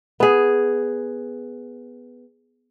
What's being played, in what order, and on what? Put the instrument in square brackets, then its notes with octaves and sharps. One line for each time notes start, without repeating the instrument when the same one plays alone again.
[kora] B3 G#4